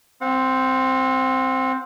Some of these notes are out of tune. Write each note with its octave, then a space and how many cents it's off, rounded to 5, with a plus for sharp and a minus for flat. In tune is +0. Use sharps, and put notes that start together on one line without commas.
C4 +0 F#5 -40